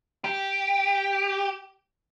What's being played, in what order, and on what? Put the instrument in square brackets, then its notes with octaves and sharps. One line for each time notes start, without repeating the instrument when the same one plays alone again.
[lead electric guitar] G4